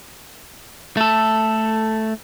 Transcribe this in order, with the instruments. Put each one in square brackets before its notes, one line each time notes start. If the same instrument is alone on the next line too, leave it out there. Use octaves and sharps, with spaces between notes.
[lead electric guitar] A3 A4